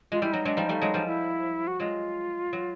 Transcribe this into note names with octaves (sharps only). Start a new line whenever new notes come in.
G#3 F4
G3 E4
F#3 D#4
F#3 G#3 D4
F3 G3 D#4
G3 A3
F#3 G#3
F3 G3
E4
F#4
F#3 G#3 F4
F#3